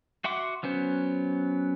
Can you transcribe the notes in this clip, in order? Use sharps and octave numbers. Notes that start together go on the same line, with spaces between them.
F#4 E5 F#5 C6 D6
F#3 B3 C#4 C5